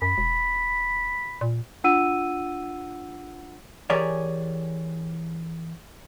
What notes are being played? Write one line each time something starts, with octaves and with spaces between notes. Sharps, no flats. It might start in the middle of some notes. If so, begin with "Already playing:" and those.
F#2 B5
E1
A#2
D4 F4 F#5 E6 D#7
E3 G4 G#4 A#4 C#5 D5